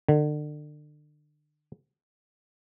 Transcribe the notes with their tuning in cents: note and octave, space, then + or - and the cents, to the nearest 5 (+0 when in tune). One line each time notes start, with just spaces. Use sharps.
D3 +30